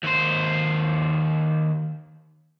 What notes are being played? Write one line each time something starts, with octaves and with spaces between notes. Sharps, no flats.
D#2 C5